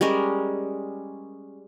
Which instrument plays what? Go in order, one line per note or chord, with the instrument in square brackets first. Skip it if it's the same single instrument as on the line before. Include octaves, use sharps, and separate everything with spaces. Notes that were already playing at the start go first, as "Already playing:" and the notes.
[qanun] G3 G#3 C#4 A#4